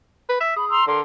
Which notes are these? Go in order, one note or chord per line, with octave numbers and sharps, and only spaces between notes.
B4
E5
G#4 B5
A#5 C6 E6
D3 A#4 C6